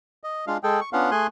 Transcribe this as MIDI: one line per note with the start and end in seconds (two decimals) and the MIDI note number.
0.24 0.45 75
0.47 0.57 56
0.47 0.57 62
0.47 0.57 65
0.47 0.57 77
0.63 0.80 56
0.63 0.80 68
0.63 0.80 69
0.63 0.80 79
0.81 0.90 85
0.93 1.11 59
0.93 1.11 61
0.93 1.11 62
0.93 1.11 65
0.93 1.11 77
0.93 1.11 78
1.11 1.27 57
1.11 1.27 68
1.11 1.27 80
1.11 1.27 84
1.11 1.27 90